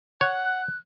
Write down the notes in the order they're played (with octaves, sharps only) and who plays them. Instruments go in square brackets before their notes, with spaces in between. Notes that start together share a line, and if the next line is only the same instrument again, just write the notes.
[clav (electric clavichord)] C#5 [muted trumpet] F#5 [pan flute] F#6